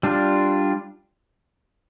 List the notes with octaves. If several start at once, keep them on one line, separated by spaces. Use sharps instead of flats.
G3 D4 F4